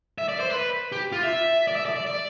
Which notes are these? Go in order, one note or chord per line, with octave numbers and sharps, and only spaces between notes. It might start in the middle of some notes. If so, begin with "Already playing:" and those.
E5
D5
C5
B4
G4
F4
E5
D5
E5
D5
D5
D5